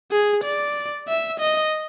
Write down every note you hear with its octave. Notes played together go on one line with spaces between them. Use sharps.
G#4
D5
E5
D#5